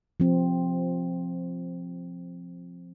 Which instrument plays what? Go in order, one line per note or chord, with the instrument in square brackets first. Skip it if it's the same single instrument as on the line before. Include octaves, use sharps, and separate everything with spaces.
[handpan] F3 C4